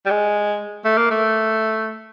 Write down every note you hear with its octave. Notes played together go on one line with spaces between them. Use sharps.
G3
G#3
A3
A#3
A3